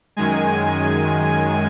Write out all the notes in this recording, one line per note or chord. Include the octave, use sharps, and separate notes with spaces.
F#2 D#3 G#3 G#5